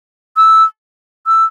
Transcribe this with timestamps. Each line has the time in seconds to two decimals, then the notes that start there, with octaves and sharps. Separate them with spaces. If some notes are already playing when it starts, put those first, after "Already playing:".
0.37 E6
1.27 E6